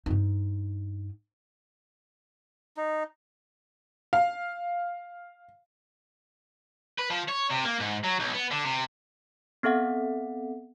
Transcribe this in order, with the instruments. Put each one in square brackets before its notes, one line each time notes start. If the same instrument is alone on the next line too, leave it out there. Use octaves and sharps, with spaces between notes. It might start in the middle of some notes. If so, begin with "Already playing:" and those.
[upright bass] G2 D#4
[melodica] D#4
[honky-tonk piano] F5
[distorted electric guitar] B4
F3
C#5
C3
A#3
G#2
F#3
B1
B3
D3
C3
[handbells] B3 C4 A4 E5 F#5